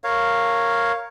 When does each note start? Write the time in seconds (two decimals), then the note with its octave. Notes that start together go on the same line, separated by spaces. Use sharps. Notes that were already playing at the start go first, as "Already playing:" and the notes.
0.04 A#4 C#5 F5